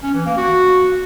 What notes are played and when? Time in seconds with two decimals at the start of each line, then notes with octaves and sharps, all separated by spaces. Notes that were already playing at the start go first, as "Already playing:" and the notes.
0.03 C#4
0.15 E3
0.26 A#3
0.38 F#4